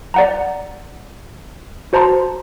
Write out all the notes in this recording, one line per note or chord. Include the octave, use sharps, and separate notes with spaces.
D5 F#5 A#5
F#4 C5 A5 A#5 C6